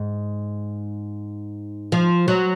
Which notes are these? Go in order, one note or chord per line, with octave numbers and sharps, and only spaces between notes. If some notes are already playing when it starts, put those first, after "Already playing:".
Already playing: G#2
F3
F#3